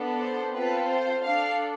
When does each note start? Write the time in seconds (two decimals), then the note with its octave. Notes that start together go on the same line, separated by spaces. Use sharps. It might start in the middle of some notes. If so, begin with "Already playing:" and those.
Already playing: B3 D4 A4
0.21 C5
0.55 C4 F4 A4 B4
0.90 C5
1.24 D4 A4 F5